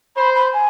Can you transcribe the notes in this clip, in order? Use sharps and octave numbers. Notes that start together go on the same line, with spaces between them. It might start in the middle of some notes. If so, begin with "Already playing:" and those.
C5 B5
B5
G#5